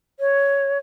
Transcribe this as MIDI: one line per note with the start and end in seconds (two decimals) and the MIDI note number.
0.20 0.78 73